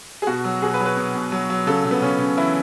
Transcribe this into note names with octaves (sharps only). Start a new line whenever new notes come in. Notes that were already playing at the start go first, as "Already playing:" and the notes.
G#4
B2 F#4
F#3
B2 G#4
B4
F#3
B4
B2
B2
F#3
F#3
C#3 A4
C#3
B3
C#3 C#4
C#3
E3 E4